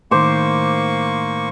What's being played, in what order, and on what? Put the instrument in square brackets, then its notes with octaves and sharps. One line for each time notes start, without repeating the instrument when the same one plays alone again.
[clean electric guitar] A2 D#3 [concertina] A#3 C#6 [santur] C5 D6